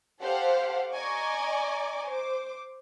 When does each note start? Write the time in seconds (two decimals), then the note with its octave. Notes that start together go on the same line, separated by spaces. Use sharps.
0.21 G4 A4 C5 F5 F#5
0.92 D5 D#5 G#5 A#5 C#6 D6
2.06 C5 D6